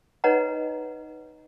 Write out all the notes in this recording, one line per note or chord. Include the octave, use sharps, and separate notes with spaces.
D#4 B4 C#5 D#5 F#5 A#5